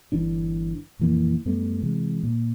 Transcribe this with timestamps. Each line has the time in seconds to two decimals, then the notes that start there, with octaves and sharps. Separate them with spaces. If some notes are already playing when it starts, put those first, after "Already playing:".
0.12 G1 E3 D4
0.99 D#1 F2 E3 A#3
1.46 F#2 G3 A3 B3
1.83 C3 E3 G#3
2.23 A#2